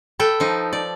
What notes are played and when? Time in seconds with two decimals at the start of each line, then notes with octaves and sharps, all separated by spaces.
0.20 A4 B4 G5
0.40 F3 D#4
0.73 D5